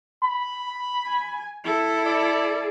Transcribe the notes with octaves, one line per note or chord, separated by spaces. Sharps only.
B5
G#5
E4 A4
D5